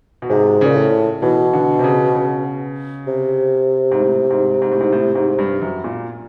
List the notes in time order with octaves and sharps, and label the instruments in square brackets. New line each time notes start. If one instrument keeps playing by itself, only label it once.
[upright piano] B2
[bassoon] G#2 [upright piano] C3
[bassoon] A#2 [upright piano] C#3
[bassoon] A2
[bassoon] B2 [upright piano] E3
[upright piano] D3
C3
C#3
C#3
[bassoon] C3
[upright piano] G#2
A2
G#2
G#2
A2
G#2
A2
G#2
G2
F#2
A#2